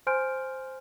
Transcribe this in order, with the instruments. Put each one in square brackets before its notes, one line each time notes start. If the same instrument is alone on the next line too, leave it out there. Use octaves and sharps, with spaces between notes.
[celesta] C5 G#5 C6 F6 G6 D7